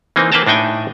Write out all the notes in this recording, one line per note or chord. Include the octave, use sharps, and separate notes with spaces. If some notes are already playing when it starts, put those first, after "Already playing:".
E3 A#3 C4 D#4
A#3 B4 C5 G5 A5 A#5
A2 D4 D#4 G5 G#5